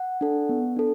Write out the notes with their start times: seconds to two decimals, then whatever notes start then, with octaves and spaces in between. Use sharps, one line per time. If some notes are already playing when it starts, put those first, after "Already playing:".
Already playing: F#5
0.21 D4 A4
0.49 B3
0.76 D4 A4